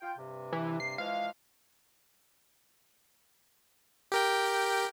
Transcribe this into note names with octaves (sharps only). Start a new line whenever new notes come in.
F4 G5
G2 C3
E3
C7
E3 F3 G#3 F5
G4 A#4 G5